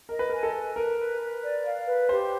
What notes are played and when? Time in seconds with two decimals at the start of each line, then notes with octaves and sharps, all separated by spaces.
0.09 A#4 D#5
0.19 B4
0.30 A#4 G#5
0.43 A4
0.54 B4
0.76 A#4 B4
0.98 B4
1.21 B4
1.43 D5
1.65 F5
1.87 B4
2.09 G4 C5